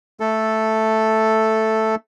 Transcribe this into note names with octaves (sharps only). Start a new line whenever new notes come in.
A3 A4